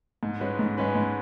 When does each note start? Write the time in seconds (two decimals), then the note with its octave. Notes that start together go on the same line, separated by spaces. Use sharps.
0.23 G#2
0.40 G#3 C#4 B4
0.59 G#2
0.78 G#3 C#4 B4
0.95 G#2